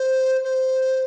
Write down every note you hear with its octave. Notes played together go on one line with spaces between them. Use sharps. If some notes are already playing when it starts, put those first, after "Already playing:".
Already playing: C5
C5